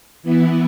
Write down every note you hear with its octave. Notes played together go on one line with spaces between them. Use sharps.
E3 B3 E4